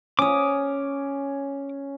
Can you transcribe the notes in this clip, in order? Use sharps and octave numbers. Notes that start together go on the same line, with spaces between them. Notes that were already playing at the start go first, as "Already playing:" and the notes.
C#4 C#5 D6 D#6